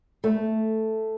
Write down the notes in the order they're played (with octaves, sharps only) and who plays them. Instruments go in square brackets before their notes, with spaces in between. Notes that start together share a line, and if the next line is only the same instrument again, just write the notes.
[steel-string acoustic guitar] A3